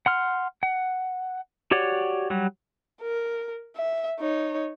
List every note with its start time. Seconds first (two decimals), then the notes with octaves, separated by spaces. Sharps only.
0.06 F#5 C6 F6
0.63 F#5
1.71 F#4 G4 C#5 D5 F#5
2.30 F#3 G3 F#4
3.02 A#4
3.76 E5
4.20 D#4 C#5